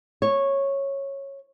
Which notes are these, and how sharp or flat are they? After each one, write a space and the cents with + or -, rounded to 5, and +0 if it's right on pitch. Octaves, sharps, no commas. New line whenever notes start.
C#5 -10